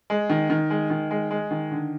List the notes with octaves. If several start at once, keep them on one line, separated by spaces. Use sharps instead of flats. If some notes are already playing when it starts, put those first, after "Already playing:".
G#3
D#3
D#3
G#3
D#3
G#3
G#3
D#3
D3